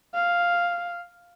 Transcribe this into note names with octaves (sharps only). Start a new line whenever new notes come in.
F5